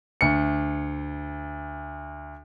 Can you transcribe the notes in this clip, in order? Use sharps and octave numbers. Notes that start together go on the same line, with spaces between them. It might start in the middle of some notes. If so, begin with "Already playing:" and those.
D2 C#7